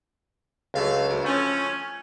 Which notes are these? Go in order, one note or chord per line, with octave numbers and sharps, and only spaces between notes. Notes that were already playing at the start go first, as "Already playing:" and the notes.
C#2 D3 F#3 A3 F5
D2
F3 A3 C#4